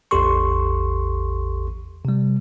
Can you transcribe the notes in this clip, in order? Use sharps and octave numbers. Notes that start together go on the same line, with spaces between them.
A1 E2 G4 A4 C6 C#6
C3 G3